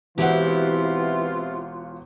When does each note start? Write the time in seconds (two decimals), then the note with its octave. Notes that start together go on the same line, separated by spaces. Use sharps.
0.18 E1 E3 C4 E4 F4 G4 F#5